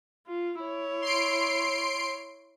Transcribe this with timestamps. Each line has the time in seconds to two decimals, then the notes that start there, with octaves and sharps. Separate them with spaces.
0.27 F4
0.62 E4 C#5
1.02 C6 C7 D7